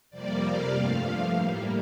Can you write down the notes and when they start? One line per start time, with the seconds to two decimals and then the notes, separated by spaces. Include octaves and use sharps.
0.10 F2 C3 G3 A#3 D5
0.42 F5
0.72 G2 F3 A3 F5
1.34 A2 G3 A#3